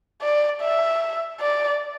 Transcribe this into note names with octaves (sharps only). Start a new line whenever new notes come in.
D5
E5
D5